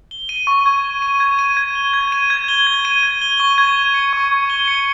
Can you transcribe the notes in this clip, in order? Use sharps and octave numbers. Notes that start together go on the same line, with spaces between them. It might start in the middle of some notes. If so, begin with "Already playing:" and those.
G7
D#7
C#6
G#6
G7
D#7
G#6
D#7
G#6
G7
G#6
D#7
G#6
G7
G#6
D#7
G#6
G7
C#6
G#6
G7
C#7
C#6
G#6
G7
C#7